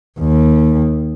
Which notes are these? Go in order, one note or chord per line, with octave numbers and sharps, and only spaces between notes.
D#2